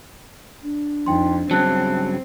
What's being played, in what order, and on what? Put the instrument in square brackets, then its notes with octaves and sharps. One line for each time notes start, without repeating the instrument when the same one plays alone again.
[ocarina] D4
[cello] F2 [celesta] D#4 G5 C6
[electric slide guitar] G2 C#3 F#3 [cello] C4 [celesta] A5 F#6